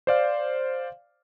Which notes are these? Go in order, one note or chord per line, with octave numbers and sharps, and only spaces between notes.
C5 D5 F5